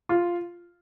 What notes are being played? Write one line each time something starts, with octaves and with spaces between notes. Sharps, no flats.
F4